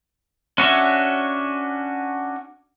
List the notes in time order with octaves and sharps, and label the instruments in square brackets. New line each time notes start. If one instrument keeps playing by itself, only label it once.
[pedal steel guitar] C#4 D4 F#4 C#5 E5